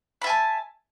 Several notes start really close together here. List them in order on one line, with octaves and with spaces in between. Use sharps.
B5 E5 G#5 A5